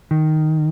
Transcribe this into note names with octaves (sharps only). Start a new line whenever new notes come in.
D#3